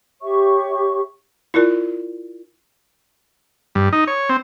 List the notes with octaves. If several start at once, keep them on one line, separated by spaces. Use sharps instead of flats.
G4 C#5 E5 C#6
E4 F4 A#4 D5
G2
D#4
C#5
C4